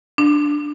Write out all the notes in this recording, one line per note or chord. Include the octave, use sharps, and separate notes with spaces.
D4